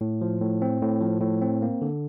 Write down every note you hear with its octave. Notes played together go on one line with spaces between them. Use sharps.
A2
F3
A2
C4
A2
F3
A2
C4
A#3
D3